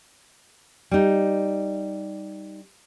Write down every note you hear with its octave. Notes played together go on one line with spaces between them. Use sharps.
G3 D#4